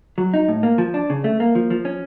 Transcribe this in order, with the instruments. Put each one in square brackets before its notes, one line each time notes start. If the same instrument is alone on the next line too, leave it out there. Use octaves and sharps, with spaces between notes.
[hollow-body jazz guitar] F#3
D#4
A2
A#3
F3
D4
C#3
A3
A#3
F3
F3
C#4